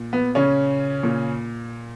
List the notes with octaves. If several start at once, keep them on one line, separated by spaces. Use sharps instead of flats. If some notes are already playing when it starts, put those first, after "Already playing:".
Already playing: A#2
B3
C#3 C#4
A#2